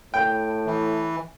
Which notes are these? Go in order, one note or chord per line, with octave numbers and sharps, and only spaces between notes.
A2 G5
E3